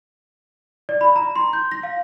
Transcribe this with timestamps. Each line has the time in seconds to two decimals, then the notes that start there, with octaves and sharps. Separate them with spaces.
0.89 D5
1.01 B5
1.16 A#5
1.36 C6
1.53 G6
1.72 A#6
1.83 F5